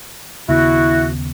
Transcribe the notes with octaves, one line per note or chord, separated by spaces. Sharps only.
D#2 C#3 B3 E4 F#4